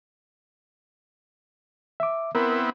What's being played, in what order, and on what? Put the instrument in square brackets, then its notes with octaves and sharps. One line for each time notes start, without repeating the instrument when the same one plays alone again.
[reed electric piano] E5 D6
[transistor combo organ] B3 C4 E4 [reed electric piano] A#4